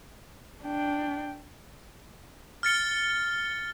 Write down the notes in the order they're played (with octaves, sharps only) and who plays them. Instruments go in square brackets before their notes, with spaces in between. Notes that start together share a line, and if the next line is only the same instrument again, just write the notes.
[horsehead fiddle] D4 G5
[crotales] F6 A6 C#7 G7